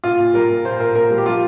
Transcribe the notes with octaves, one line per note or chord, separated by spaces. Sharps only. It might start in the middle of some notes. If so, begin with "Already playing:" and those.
A#2 F4
A#2
G3 A#4
A#2
A#2 C5
A#2 A#4
A#2 A#4
G3
G4
F3 F4